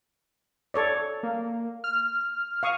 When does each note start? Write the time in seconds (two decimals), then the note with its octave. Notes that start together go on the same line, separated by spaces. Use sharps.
0.74 A4 C#5 D5
1.23 A#3
1.84 F6
2.63 F5 C#6 D#6